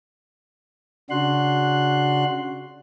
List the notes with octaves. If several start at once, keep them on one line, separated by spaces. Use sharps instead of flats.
C#3 D4 F#4 C6 F#6